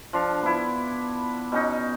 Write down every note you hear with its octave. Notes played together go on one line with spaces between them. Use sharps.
F3 D4 F5
B3 E4
B2 C#4 D#4